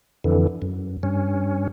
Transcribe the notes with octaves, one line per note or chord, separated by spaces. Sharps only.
F2 D3 E3
F#2
G2 C#4